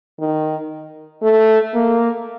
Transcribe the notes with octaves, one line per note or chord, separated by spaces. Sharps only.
D#3
A3
A#3